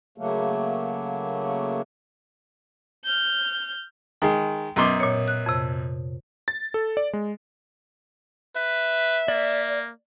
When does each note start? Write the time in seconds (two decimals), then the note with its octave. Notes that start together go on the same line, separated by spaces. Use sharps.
0.18 C#3 F#3 A3 A#3
3.04 F6 G6
4.22 D#3 G#3
4.76 F#2 B2 A#5 C6 D6
5.00 A#2 C#5
5.28 F#6
5.46 F2 C3
6.48 A6
6.74 A4
6.97 D5
7.13 G#3
8.56 B4 E5
9.28 A#3 D5